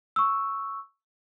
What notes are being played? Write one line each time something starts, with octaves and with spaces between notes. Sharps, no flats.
C#6 E6